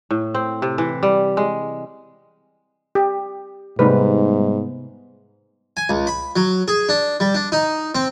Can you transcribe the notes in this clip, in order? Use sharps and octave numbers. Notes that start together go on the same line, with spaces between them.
A2
C4
C3
E3
G3
G#3
G4
G#2 C3 G3 A3 B3 D#4 B4
G#5
C#2
B5
F#3
G#4
D4
G3
D4
D#4
C4